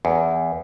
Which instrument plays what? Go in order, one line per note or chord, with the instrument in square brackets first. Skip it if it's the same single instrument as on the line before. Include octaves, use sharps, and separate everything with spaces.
[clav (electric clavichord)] E2